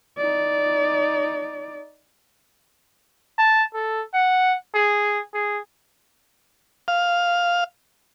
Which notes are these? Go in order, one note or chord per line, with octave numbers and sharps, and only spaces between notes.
D#4 D5
A5
A4
F#5
G#4
G#4
F5